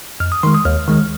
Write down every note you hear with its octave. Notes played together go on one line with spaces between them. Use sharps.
F2 F6
D#6
D#3 G#3 C6
D#6
D#2 F6
D#3 G#3